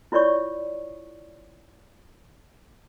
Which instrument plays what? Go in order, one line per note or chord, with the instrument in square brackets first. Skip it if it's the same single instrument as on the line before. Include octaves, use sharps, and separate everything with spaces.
[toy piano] E4 F4 C#5 D5 C#6